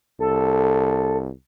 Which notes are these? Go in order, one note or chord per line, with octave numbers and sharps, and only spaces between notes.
C2 A4